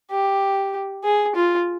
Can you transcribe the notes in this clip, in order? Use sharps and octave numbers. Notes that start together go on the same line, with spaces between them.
G4
G#4
F4